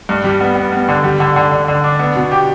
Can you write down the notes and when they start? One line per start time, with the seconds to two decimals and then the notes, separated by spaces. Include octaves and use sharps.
0.09 G2
0.24 G3
0.41 B3
0.56 B3
0.72 B3
0.89 D3
1.04 G3
1.20 D3
1.36 D3
1.52 D3
1.68 D3
1.84 D4
1.99 B3
2.16 B2
2.31 G4